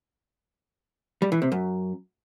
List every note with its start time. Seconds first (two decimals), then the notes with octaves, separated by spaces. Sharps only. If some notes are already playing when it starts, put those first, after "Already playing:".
1.22 G3
1.32 E3
1.42 C3
1.52 F#2